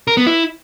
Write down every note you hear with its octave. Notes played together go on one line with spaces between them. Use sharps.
A#4
B3
E4